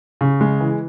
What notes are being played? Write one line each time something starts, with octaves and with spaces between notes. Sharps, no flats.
C#3
G#3
E3